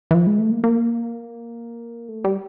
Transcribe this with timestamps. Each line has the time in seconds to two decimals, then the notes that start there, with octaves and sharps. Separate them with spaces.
0.11 E3
0.14 F3
0.27 G#3
0.39 A3
0.51 A#3
0.64 A#3
2.09 A3
2.24 G3